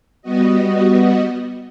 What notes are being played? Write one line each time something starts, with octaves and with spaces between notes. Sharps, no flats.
G3 B3 F#4 D#5